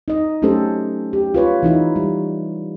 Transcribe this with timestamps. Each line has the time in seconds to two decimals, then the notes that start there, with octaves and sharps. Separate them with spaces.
0.08 D#4 D#5
0.42 F#3 A3 C#4 G4 A4 C5
1.13 G4
1.34 F4 B4 C#5
1.63 E3 D#4 E4
1.96 G3